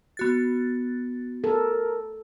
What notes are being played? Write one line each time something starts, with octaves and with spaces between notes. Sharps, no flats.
B3 F#4 A6
A4 A#4